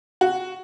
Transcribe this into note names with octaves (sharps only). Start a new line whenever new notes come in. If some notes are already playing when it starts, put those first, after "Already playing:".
F#4